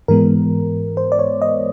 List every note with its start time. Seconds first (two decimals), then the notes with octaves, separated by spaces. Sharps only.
0.08 G#2 E3 G#3 B3 A#4
0.97 C5
1.12 D5
1.19 C#5
1.42 D#5